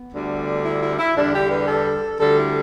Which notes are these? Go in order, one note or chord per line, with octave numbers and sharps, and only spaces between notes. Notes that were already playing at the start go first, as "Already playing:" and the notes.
Already playing: B3
D2 D3 G3
E4
E4
E4
E2 D3 G3 D4
G4
B4
A4
D2 D3 G3 A4
E4